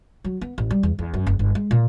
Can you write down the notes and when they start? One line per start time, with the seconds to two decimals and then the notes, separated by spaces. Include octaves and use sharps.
0.24 F#3
0.41 B3
0.58 A1
0.71 G3
0.83 E2
0.99 E2
1.14 F#2
1.27 F#1
1.39 G1
1.55 G#3
1.71 A#2